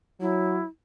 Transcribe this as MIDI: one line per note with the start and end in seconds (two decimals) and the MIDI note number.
0.21 0.60 54
0.21 0.65 64